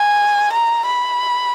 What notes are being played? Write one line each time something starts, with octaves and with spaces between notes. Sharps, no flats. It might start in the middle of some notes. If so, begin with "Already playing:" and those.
Already playing: G#5
A#5
B5